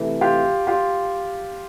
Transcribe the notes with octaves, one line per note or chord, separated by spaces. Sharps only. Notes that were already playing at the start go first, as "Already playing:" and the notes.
Already playing: C3 E3 A3
F4 G4
F4 G4